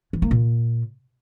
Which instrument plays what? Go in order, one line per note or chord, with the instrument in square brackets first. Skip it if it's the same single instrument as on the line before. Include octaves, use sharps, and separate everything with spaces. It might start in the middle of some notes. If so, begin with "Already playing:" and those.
[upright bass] E3
A#3
A#2